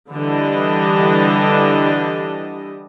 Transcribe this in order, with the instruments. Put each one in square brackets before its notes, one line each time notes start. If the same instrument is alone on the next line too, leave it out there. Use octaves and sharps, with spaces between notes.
[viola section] D3 E3 G3 D4 G4 D#5